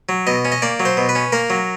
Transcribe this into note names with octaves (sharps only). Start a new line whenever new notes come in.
F#3
B2 D#5
C#4
D#5
A#3 D5
F#3
C5
B2
B4
C#4
A#3 A#4
F#3